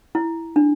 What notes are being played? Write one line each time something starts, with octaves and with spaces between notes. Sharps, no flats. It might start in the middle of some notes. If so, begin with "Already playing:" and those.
E4
D4